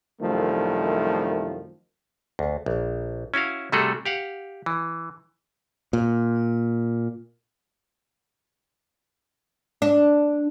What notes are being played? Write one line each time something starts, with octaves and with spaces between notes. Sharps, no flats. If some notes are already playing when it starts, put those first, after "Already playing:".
C2 F#2 D#3 F3 A3
D2
A#1
C#4 E4 F#4 F5
C3 G3 A3 F#4 G#4 A4
G4 F5 F#5
E3
A#2
D4